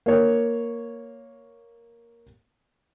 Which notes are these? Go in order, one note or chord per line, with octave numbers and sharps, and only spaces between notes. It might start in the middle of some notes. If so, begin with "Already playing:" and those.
A#3 C#5